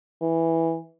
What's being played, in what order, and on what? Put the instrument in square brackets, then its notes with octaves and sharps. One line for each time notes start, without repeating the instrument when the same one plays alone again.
[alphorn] E3